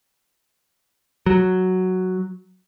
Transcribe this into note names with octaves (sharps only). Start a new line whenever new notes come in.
F#3